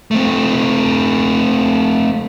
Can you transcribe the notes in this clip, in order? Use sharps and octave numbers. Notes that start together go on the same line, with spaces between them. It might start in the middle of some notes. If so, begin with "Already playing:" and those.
A3 C4